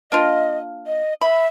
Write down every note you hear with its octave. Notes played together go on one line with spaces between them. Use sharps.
A#3 D4 F4 D#5
D#5
E5 B5